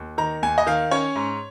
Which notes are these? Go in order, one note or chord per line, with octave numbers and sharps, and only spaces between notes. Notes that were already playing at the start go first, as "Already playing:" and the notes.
Already playing: D#2
D#3 A#5
D#2 G#5
D#5
D#3 F5
C#4 C#5
G#2